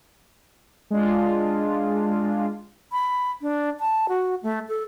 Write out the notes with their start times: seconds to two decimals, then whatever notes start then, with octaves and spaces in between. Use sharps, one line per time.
0.91 G#3 D4 F4
2.92 B5
3.42 D4
3.80 A5
4.09 F#4
4.43 A3
4.69 A4